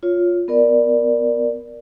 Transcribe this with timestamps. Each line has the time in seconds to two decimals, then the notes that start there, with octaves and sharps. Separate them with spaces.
0.03 F4 C#5
0.48 B3 A#4 D5